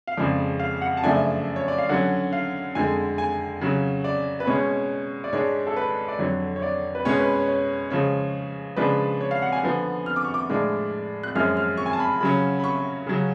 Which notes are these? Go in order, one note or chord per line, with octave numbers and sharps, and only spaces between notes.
F5
F2 C#3 F3 G#3 D5
F5
F#5
A5
F#2 C#3 F3 A3 D4 G#5
C#5
D5
F5
D3 F#3 C#4 F#5
F5
F2 D3 G#3 G#5
G#5
C#3 F#3 C#4
D5
B4
B2 G#3 C#4 C#5
D5
G#2 G#3 D4 C#5
A4
B4
D5
F2 D3 F#3 C#5
C#5
D5
B4
B2 G#3 C#4 C#5
B4
C#5
C#5
C#3 F3 G#3 C#5
C#3 F3 G#3 D4 B4
C#5
F5
F#5
G#5
D3 F3 B3
F6
D6
C#6
D6
A2 F3 G#3 D4
F#6
F#2 F3 G#3 C#4 F6
F6
C#6
G#5
A5
B5
C#3 F#3 C#4 B5
B5
C#6
C#3 F#3 C#4